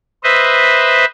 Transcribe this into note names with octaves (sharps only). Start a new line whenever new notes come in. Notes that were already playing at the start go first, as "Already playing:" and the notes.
B4 C5 D#5 E5